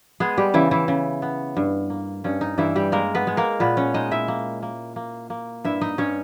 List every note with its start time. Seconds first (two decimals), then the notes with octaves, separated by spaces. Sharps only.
0.20 G#3 B3 G#4
0.37 G3 G4
0.54 C#3 E3 E4
0.71 E3 E4
0.88 C#3
1.22 B3
1.57 G2
1.90 A#3
2.24 G2 C#4
2.41 D#4
2.58 G2 E3 E4
2.76 G3 G4
2.92 G#3 A#3 A#4
3.15 B3 B4
3.27 G#3
3.37 A#3 A#4
3.60 A#2 B3 B4
3.77 C#4 C#5
3.94 G#3 D#4 D#5
4.11 E4 E5
4.28 A#3
4.62 A#3
4.96 A#3
5.30 A#3
5.64 G2 E4 E5
5.81 D#4 D#5
5.98 G2 C#4 C#5